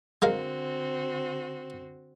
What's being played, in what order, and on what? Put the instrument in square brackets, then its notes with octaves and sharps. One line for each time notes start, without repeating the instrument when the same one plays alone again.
[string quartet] D3 C4 F#4 [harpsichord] G#3 A#4 F5